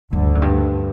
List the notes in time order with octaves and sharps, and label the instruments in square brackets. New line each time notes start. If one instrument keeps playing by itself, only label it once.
[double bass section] D2 D3 [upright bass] G2
[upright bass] F#2
G2